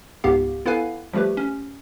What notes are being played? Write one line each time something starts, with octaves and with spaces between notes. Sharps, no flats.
C#2 G#2 B3 G4 F5
B3 E4 A4 B4 F5 G#5
F3 G3 A3 G4 B4
C#4